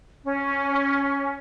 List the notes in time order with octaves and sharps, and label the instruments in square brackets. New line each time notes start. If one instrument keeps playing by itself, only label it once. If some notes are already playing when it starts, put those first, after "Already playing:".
[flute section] C#4